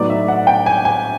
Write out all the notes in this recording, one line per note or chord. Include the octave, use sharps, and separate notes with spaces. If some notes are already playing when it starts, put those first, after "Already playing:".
Already playing: A2 F#3 B3 D#4 D5
E5
F#5
G5
G#5
G#5